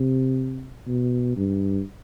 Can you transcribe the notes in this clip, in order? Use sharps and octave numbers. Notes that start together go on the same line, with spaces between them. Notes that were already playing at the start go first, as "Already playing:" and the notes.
Already playing: C3
B2
G2